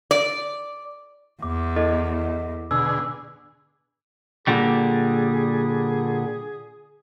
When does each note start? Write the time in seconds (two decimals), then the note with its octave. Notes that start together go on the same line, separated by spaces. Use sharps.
0.11 D5
1.42 E2 D6
1.76 E4 A4 D#5
2.71 B2 D3 G#4 E6
4.47 A#2 D3 G3 G#4